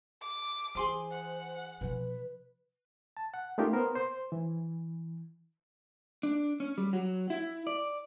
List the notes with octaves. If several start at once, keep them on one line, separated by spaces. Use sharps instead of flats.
D6
E3 G#4 C5 C6 D#6
F#5
B2 F3 B4
A5
F#5
A3 C#4 D#4 F4 G4 A#4
B3 A#4 C5
C5
E3
D4
C#4
G3
F#3
E4
D5